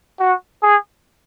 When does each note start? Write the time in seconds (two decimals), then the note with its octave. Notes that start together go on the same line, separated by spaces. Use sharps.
0.20 F#4
0.63 G#4